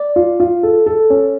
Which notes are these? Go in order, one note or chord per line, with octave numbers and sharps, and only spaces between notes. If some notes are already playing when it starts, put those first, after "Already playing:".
Already playing: D5
F4
F4
A4
A4
C#4